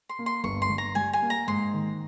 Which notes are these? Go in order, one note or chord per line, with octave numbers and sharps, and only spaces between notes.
C6
A#3
C6
G1 C#6
C6
G2
A#5
G3 G#5
G#5
A#3
A#5
G#2 C6
D#3